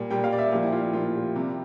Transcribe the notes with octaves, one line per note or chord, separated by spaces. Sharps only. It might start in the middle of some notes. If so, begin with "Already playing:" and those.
Already playing: A#2 G3
A#2 G3 G5
F5
D5
E5
A#2 F3 G4
E4
F4
E4
A#2 F3 F4
G4
C3 G3